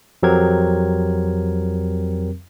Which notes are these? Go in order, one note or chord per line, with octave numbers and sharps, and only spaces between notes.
F2 F#3 C4 G4 A#4 G#6